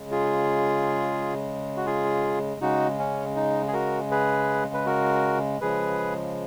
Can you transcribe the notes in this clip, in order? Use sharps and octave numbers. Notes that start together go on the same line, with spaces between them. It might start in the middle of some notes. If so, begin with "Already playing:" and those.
Already playing: C#3 G#3
F4 G#4
F#4
F4 G#4
C#3 G#3 D#4 F#4
C#4
D#4
G#4
F#4 A#4
G#4 B4
B4
F#4 A#4
C#3 F3 G#3 G#4 B4